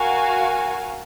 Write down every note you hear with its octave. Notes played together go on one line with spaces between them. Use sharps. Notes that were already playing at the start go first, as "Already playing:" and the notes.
Already playing: F#4 A#4 F5 G#5